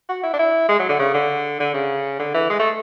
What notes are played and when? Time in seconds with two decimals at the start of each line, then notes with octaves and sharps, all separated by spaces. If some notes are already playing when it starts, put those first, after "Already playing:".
0.09 F#4
0.23 E4
0.33 D4
0.39 E4
0.69 G#3
0.79 F#3
0.89 D3
0.99 C#3
1.14 D3
1.60 D3
1.74 C#3
2.19 D3
2.34 E3
2.49 G#3
2.59 A3